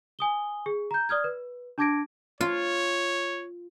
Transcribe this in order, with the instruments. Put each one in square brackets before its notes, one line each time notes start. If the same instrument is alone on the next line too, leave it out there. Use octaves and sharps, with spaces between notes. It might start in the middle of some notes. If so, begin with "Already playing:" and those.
[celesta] G#5 D#6 G7
G#4
A#5 G6
D5 D#6 F6 G#6
B4
D4 A5 D6 G#6 A#6 D7
[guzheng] F4 [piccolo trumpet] C#5